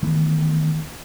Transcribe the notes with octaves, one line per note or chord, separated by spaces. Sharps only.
D#3 E3 A3 B3